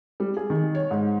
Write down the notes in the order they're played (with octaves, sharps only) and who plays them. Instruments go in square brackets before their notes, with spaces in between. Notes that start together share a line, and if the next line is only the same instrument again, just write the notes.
[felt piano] G3
G#4
D#3
C#5
G#2